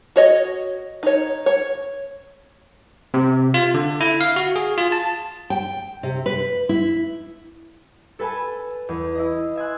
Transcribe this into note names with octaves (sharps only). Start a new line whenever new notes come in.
F#4 C#5 D#5
D#4 C#5
C#5
C3
F4
D3
E4
F5
F#4
G#4
F4
A5
G5
C3
B4
E4
A4 B4 G#5 A5
E2
E4 D#5
E5 G#5 C6 F#6